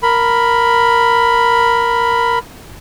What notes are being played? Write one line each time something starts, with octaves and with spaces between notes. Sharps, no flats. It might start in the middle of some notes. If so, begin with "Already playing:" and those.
A#4 B5